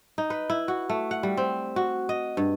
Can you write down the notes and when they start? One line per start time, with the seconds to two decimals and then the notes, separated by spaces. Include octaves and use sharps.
0.18 D#4
0.30 B4
0.50 E4
0.68 F#4
0.89 A3
1.11 F#5
1.23 G3
1.37 C4
1.76 F#4
2.09 D#5
2.37 G2